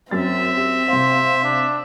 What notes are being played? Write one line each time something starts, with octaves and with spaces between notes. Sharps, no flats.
F#2 C4 E5 A6
G4
C3 C5 F5
D4